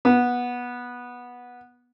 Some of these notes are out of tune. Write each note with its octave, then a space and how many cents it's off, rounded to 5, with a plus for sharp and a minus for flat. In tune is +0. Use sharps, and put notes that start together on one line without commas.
B3 -15